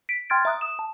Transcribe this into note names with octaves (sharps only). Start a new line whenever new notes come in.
B6 D7
G5 C6 F6 G#6 A6 D7
E5 A#5 D#6 F#6
D#6 E7
A5